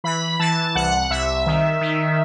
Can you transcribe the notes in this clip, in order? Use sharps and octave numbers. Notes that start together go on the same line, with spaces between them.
E3 B5
E3 A5
C2 F#5
C2 E5
D#3
D#3